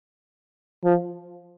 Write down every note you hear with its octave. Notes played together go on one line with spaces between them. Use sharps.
F3